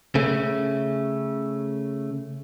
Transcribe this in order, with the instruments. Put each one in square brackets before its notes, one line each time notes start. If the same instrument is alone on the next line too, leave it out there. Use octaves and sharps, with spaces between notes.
[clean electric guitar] C#3 A3